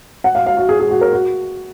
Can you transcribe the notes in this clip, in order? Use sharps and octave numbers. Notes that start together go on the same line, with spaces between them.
F#5
F5
F5
F#4
G#4
G#4
F#4
A#4
F#4